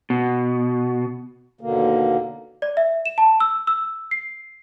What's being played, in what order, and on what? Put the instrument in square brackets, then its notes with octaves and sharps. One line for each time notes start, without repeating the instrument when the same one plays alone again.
[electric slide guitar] B2
[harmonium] D#2 B2 D3 A#3
[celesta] D5
E5
E7
A5
E6
E6
C7